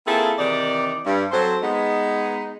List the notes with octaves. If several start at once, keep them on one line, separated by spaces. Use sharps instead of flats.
A#3 C4 E4 F4 G#4 A4
C3 D#3 E3 D#4 D5
G2
F#3 C4 A4 C5
G#3 B3 D#4